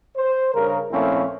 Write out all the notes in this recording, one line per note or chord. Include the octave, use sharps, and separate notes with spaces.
C5
G2 C#3 A#4
A#2 F3 A3 C4 C#4 E4